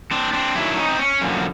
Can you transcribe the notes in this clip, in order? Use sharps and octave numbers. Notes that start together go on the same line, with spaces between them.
C4 D4
C4 D4
F#2 D#3 F#3 D4 E4
C#4 D#4
C4
C#4
F#2 D3 F3 A#3